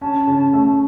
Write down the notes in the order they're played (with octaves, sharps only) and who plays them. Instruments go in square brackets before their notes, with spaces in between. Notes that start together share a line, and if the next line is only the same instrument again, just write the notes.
[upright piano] C#4 [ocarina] A5
[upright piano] C#3
A3